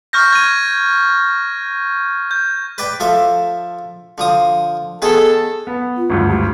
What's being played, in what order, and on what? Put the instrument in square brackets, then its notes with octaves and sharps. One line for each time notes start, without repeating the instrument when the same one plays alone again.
[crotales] C#6 F6 G6 A#6
G#6 D#7
G6
[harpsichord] B4 D5 G5
F3 A4 E5
D3 F3 D#6
[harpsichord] D#3 B3 G#4 [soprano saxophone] A4
[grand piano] B3
[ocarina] F4
[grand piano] G#1 D2 G2
[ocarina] G4